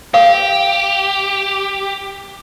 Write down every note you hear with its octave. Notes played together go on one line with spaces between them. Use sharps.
G4 F5